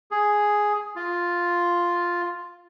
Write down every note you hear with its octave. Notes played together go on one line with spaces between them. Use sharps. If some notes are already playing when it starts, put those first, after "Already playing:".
G#4
F4